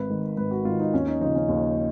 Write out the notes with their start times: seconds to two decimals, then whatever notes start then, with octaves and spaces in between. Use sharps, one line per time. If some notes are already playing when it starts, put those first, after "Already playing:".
Already playing: G#1 B4
0.09 G#2 D#3
0.37 G#1 B4
0.51 F#4
0.65 G#2 D#3 F4
0.80 D#4
0.93 D#2 C#4
1.07 D#4
1.21 C#3 F3 D#4
1.35 C#4
1.49 D#2